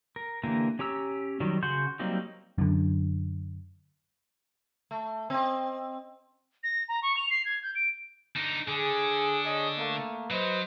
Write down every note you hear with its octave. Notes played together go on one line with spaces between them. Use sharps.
A#4
D3 E3 A#3 G4 A#4
C#4 G4 A#5 E6
D#3 F#3 G3
C#3 F#4 C6 G6
F#3 G3 A#3 C4 D#4
F#2 D3
A3
C4 D#5
A#6
A#5
C#6
F7
C7
G#6
G6
D7
D3 D#4
D3 G#4
G#4 C#5 D#5
A3 A#3
F#3 B4 C5 D#5